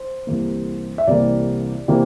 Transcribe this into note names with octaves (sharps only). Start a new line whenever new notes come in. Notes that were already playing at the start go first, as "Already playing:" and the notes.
Already playing: C5
C2 C3 E3 A#3
E5
C2 C3 E3 A#3 D5
C3 E3 A#3